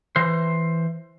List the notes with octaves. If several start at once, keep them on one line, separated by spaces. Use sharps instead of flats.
E3 C5